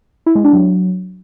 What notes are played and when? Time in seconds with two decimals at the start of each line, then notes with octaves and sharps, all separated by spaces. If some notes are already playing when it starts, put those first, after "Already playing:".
0.26 E4
0.35 G#3
0.44 D4
0.53 F#3